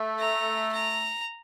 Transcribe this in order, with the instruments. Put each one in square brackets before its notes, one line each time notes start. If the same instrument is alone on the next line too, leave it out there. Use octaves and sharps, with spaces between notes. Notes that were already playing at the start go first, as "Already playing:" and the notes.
Already playing: [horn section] A3
[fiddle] A#5
A#5